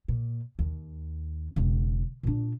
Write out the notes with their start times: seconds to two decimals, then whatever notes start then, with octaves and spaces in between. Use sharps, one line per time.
0.08 A#2
0.59 D#2
1.56 E1 C#3
2.23 A#2 D4